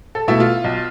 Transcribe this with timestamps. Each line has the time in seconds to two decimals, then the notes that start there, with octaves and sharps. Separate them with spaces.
0.15 A4
0.28 B2 A3 E4
0.40 F4
0.64 B1